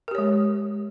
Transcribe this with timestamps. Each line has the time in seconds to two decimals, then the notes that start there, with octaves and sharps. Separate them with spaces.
0.08 A#4
0.11 G4
0.15 C#5
0.18 G#3